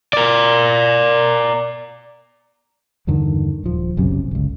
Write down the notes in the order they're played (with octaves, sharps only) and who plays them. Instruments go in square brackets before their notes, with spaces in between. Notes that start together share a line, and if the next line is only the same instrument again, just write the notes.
[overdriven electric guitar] A#4 D5
[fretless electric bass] E2 G2 D3 D#3
D#1 F3
F#1 B1 F#2 C3
G1 C#2